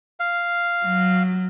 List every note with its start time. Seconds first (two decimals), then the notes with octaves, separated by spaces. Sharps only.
0.20 F5
0.85 F#3